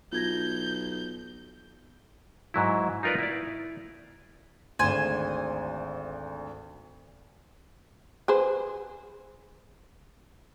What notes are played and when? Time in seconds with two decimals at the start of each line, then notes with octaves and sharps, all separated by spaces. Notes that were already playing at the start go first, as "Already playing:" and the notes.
0.12 B1 F4 G6 G#6 A#6
2.54 G#2 F#3 E4
3.03 D#4 F4 A#4 B4 D5
3.19 E4 D5
4.79 G#1 D2 C5 G#5
8.28 G#4 B4 C5